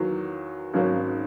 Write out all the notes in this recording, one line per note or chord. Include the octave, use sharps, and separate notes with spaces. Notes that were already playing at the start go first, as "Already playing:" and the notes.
Already playing: E2 D#3 F#3 A#3
G#1 G#2 F#3 A#3 C#4